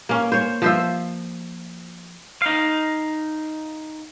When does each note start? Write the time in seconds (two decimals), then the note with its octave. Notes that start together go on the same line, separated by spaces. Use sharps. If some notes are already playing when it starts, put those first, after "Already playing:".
0.09 A#3 C#4
0.32 C5 C#5
0.62 F3 C5 E5
2.42 D#4 F5